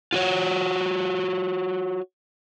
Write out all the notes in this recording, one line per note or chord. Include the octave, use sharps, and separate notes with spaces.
F4 F#4 C#5